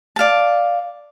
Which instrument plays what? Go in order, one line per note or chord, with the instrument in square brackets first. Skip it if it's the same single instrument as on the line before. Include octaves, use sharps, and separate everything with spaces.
[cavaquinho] D5 F5 A5